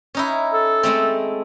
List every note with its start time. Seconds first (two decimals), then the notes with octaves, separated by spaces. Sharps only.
0.15 C#4 D#4 E4
0.53 A4
0.83 G#3 A3 C4